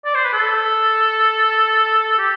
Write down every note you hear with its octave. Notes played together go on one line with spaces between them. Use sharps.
D5
C5
B4
A4
G4